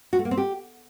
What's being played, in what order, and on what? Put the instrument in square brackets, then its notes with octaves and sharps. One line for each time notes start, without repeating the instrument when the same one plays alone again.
[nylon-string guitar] F#4
A3
A#3
C4
G4